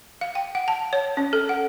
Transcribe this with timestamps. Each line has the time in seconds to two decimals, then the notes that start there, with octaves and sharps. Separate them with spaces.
0.21 F5
0.35 G5
0.55 F#5
0.68 A5
0.93 C#5
1.17 C#4
1.33 A4
1.49 F#5